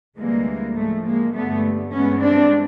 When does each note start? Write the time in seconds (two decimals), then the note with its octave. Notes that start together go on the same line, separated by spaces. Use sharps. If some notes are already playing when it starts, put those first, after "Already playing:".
0.18 D2 C3 E3 G3 G#3 A#3
0.76 A2 F3 G#3 A3
1.05 G#3 A#3
1.34 G2 D3 G3 A3 B3
1.92 G2 E3 G#3 B3 C#4
2.21 C4 D4